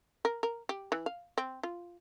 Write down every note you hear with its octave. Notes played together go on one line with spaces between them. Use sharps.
A#4
A#4
G4
E3
F5
C4
F4